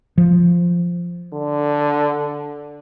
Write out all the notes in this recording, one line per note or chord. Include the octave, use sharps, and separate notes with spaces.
F3
D3